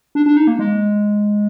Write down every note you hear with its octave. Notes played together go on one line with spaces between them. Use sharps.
D4
D4
D#4
A#3
G#3